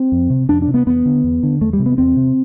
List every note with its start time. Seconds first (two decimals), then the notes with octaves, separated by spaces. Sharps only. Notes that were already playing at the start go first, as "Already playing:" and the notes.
Already playing: C4
0.12 F2
0.30 C3
0.49 F2 D4
0.62 D4
0.67 C3
0.74 B3
0.86 E2 B3
1.05 D3
1.24 E2
1.43 D3
1.61 E2 A3
1.73 G3
1.79 C3
1.86 B3
1.98 E2 C4
2.16 C3